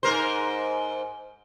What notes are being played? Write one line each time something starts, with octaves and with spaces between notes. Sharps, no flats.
G#2 A#4 C5